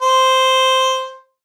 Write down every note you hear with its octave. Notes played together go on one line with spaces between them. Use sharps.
C5